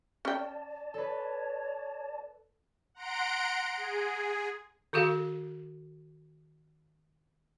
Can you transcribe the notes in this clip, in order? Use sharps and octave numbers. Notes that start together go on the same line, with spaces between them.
C#4 D5 G5 A5
A4 B4 C#5
F#5 A#5 C6 D7
G#4
D#3 F#4 G#4 A4 F5